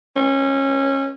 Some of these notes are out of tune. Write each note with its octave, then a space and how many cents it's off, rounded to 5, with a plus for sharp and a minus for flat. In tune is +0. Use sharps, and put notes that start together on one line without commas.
C#4 -20